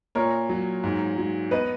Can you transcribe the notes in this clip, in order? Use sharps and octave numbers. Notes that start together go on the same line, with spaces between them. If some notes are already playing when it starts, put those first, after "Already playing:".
A#2 A#4 C#5
F#3
G#2
F#3
B3 B4 D#5